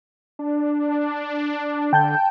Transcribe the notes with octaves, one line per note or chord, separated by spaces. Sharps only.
D4
D3 G5 A5 G6